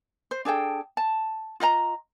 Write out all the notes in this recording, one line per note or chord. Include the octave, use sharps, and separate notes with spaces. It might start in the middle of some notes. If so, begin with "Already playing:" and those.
C5
D4 G#4 A4 G5
A5
F4 D#5 F5 A#5